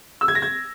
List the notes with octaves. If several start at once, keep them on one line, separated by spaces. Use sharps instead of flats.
E6
G#6
A#6
G#6